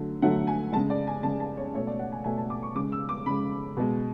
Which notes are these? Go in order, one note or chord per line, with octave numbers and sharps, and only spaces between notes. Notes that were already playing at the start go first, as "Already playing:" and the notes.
Already playing: D3 F#3 A3
D3 F#3 A3 F#5
G#5
C#3 G#3 A5
D5
G#5
C#3 G#3 A5
A5
C#5
B2 A3 C#5
D5
F#5
G#5
B2 A3 G#5
A5
D6
C#6
C#3 G#3 D6
E6
D6
C#3 G#3 B5
B2 G#3